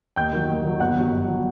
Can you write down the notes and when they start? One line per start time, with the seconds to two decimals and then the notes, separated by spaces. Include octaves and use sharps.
0.16 D#2 G5 G6
0.33 D#3 F#3
0.48 D#2
0.64 D#3 F#3
0.80 G1 F#5 F#6
0.96 G2 F#3
1.12 G1
1.28 F#3